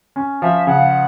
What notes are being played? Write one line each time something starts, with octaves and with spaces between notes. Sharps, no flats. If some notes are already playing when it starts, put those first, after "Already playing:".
C#4
F3 E5
C#3 F#5